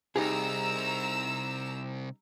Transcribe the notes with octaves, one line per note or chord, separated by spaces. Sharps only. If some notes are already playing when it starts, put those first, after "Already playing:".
C2 D#4 G4 G#4 A#5 E6